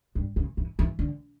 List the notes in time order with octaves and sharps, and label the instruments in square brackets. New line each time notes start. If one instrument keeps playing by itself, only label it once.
[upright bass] G2
C#3
E3
E3
D3